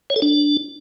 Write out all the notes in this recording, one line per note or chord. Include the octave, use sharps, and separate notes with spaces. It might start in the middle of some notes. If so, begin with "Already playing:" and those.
C#5
A4
D4